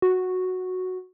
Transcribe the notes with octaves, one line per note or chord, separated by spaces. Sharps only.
F#4